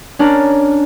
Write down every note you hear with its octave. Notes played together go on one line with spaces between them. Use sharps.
C#4 D4 A#4